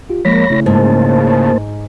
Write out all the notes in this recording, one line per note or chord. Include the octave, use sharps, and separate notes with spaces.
F4 G4
F3 G#3 A#3 C#5 B5 A#6 B6
C#3 A3 E4
G#2 A#3 C5 A5